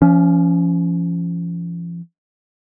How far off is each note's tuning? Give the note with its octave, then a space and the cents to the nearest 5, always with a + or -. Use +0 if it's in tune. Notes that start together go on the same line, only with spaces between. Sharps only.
F3 -35 C#4 +15